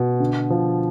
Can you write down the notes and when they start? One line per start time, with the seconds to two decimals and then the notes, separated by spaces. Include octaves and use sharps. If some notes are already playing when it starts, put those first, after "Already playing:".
Already playing: B2
0.20 D3
0.50 F3